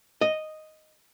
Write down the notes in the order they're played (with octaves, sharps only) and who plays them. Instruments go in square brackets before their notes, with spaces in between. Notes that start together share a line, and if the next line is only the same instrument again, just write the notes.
[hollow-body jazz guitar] D#5